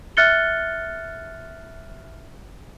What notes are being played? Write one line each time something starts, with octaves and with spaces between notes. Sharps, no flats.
E5 F6 F#6 A6 C#7 G7